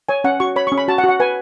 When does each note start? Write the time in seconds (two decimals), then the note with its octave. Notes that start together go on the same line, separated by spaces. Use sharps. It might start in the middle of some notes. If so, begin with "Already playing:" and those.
0.09 C#5 G#5
0.24 C#4 F#5
0.40 F#4 C#6
0.56 C#5 B5
0.67 C#6
0.72 C#4
0.78 B5
0.88 F#4 A5
0.98 F#5
1.04 F#4
1.09 F#5
1.20 B4 G#5